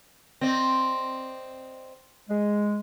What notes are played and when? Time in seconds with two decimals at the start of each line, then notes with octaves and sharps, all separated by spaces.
0.41 C4 D5 D#5
2.30 G#3